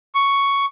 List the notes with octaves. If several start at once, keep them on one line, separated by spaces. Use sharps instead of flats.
C#6